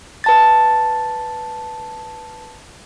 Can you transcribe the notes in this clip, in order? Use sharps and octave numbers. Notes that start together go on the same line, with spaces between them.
B4 A5 A6